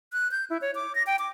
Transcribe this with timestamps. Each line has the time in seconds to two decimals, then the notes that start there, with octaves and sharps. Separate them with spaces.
0.13 F#6
0.31 G6
0.50 E4
0.61 C#5
0.75 D6
0.95 A#6
1.07 G5
1.19 D6